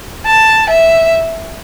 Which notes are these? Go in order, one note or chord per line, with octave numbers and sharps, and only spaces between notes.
A5
E5